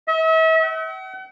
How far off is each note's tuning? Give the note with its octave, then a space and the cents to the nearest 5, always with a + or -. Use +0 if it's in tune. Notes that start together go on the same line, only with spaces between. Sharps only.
E5 -40
F#5 +40